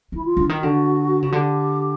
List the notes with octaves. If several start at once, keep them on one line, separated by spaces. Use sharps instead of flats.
D#3 E4
F4
D3
D#3
D3 F#4
C#3
D3 G4